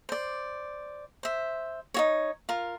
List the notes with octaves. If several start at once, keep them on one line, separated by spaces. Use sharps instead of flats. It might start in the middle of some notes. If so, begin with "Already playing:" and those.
C5 D5
C5 E5
D#4 F#4 C#5
F4 A#4